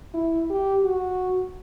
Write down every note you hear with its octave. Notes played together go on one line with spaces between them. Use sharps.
E4
G4
F#4